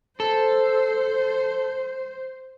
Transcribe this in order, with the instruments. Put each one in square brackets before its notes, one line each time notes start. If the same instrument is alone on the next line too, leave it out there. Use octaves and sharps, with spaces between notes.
[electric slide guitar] A4 [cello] C5